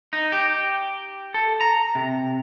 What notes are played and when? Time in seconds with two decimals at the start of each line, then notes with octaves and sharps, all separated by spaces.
0.13 D#4
0.32 G4
1.34 A4
1.61 A#5
1.95 C3